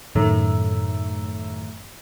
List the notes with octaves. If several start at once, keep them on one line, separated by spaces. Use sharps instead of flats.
F#2 A2 D#3 A3